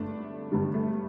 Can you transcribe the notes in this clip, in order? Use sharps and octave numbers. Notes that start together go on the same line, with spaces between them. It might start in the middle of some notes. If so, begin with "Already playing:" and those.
Already playing: G2 D3 A3 D4
G2 D3 G3
A3